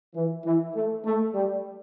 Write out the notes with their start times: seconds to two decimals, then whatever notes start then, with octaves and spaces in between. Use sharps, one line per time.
0.15 E3
0.45 E3
0.74 A3
1.04 A3
1.35 G3